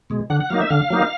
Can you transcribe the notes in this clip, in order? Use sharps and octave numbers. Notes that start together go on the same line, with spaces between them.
B2 G#3
D3 F#5
F#5
F#3 A#3 D#4 F5
E5
D3 F5
F#3 A#3 D#4